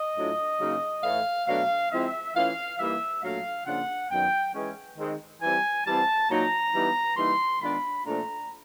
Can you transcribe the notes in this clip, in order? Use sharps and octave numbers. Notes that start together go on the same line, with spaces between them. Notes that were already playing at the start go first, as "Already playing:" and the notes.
Already playing: D#5
A2 F#3 A3 D4 F4
C#3 F#3 A#3 D#4
A2 E3 A3 F5
B2 F#3 A3 D4 F5
F3 G#3 C4 E4 E5
E3 A3 C#4 F4 F5
E3 G3 A#3 D#4 E5
A#2 F#3 A3 D4 F5
C#3 F3 A#3 D4 F4 F#5
F#2 D#3 F#3 B3 G5
E3 G#3 C#4
D#3 G#3 C4
E3 G3 C4 G#5
E3 G3 C4 A5
A#2 F#3 A#3 D#4 A#5
E3 G3 B3 D#4
E3 G3 A#3 D#4 C6
D#3 G#3 B3 D4 F4 B5
A#2 F3 A3 D4 F4 A#5